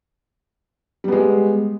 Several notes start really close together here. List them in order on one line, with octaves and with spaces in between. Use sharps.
G3 B3 G#3